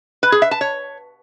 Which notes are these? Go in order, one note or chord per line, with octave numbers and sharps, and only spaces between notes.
B4
G#4
E5
A5
C#5